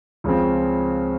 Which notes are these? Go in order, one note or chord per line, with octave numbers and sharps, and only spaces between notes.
C#2 C#3 F3 C4